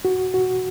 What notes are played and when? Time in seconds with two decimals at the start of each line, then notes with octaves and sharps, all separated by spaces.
0.05 F#4
0.34 F#4